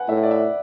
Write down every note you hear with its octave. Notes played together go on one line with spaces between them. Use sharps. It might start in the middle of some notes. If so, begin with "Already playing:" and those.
Already playing: B4 F#5 G#5
A2 E5
D5
E5